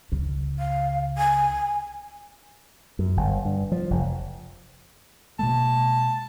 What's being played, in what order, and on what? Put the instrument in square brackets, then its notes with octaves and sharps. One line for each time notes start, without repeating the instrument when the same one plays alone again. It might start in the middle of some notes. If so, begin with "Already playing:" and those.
[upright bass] C#2 C#3
[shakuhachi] F5
G#5
[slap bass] F#2
G1
G2
F3
F1
[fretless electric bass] B2 G#3 A#3 [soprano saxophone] A5